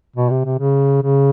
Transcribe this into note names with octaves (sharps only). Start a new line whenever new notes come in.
B2
C3
C3
C#3
C#3